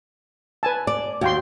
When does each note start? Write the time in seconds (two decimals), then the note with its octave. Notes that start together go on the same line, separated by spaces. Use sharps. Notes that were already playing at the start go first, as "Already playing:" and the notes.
0.63 B4 G#5 A5
0.87 D5
1.21 D#2 F#4 G5 C6